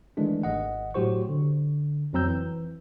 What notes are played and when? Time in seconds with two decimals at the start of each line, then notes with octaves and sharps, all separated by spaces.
0.17 D#3 E3 G#3 A3 D4
0.43 G#1 D#5 F#5
0.94 A2 F#3 F#4 G4 C5 C#6
1.29 D3
2.13 F2 F#3 C4 A#5 E6 G6
2.27 E3